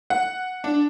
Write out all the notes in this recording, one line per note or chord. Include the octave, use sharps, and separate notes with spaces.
F#5
D4